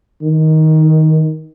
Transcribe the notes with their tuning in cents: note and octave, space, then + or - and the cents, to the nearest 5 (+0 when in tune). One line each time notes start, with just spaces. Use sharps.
D#3 +15